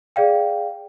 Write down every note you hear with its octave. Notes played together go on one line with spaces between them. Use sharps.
G#4 D5 F5 G5